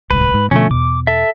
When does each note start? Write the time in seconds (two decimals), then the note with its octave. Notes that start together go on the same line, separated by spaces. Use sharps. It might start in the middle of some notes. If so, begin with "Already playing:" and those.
0.11 D1 C2 G#2 B4
0.34 G#2
0.51 B2 D3 F3 A3 C#4
0.71 E2 B2 D6
1.07 A4 E5